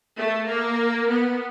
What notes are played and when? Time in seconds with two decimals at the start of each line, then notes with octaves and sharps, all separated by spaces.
0.18 A3
0.49 A#3
1.10 B3